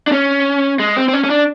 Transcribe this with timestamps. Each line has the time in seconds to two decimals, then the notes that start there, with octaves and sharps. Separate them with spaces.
0.07 D4
0.12 C#4
0.80 G#3
0.96 C4
1.08 C4
1.14 C#4
1.24 C#4
1.30 D4